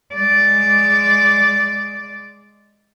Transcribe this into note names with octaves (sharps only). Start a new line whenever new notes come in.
G#3 D5